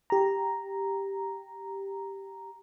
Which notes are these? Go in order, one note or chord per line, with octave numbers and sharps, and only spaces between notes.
G4 A#5